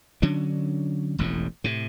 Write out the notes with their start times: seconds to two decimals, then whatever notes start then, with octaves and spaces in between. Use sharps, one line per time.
0.22 D3 F#3 C#4 D4
1.19 E1 A1 F2 A2
1.64 A2 C3